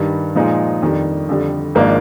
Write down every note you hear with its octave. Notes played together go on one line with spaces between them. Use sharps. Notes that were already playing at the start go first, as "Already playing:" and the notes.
Already playing: G2 D#3 G3
A#2 F3 G#3 D#4
F2 D#3 G3 D4
F2 D3 G3
G#1 G#2 F3 A#3 D4